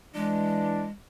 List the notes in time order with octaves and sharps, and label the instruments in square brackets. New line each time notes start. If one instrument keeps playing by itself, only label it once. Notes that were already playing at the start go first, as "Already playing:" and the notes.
[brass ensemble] E3 D4 [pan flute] G#3